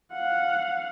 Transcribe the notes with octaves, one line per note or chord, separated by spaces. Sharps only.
F5 F#5